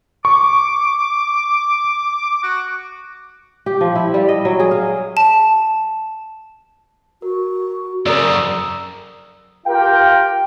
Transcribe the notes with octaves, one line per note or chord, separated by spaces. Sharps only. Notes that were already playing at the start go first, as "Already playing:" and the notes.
C#6 D6
F#4
G4
F3
E4
G3
D#5
F#3
G#4
F5
A5
F#4 A#4
F#2 C#3 C4 A#4 D5 A#5 D#6 E6
F4 G4 A#4 F5 G5